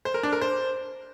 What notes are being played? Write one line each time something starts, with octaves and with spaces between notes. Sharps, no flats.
C5
A#4
D4
A#4
C5